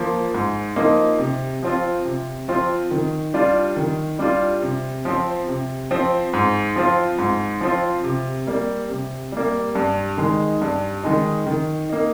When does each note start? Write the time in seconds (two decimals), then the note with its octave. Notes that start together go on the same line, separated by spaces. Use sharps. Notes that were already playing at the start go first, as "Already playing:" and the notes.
Already playing: F3 A#3
0.34 G#2
0.76 F3 A#3 D#4
1.19 C3
1.63 F3 C4 F4
2.05 C3
2.48 F3 C4 F4
2.91 D#3
3.34 G3 D4 F4
3.76 D#3
4.19 G3 D4 F4
4.62 C3
5.05 F3 C4
5.48 C3
5.91 F3 C4
6.33 G#2
6.76 F3 C4 F4
7.18 G#2
7.61 F3 C4 F4
8.04 C3
8.47 G3 A#3
8.90 C3
9.32 G3 A#3
9.75 G2
10.17 D#3 G#3 D#4
10.61 G2
11.03 D#3 G#3 D#4
11.47 D#3
11.89 A#3 D#4